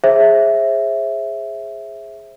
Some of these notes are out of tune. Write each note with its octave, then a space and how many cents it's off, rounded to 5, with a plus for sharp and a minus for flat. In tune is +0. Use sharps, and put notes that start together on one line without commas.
G#4 +0 C5 +35 E5 +0